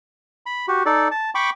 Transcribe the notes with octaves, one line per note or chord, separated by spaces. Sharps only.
B5
F#4 G4
D#4 A4 D5
A5
G5 B5 C#6 D6